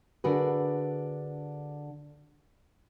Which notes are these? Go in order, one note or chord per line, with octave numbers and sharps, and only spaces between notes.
D3 D4 F#4 G#4 A#4 B4